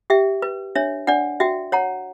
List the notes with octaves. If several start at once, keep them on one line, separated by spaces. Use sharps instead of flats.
G4 E5 G5
B4
D4 C#5 E5
D4 D5 F#5
F#4 E5 G5
C#5 F#5 A#5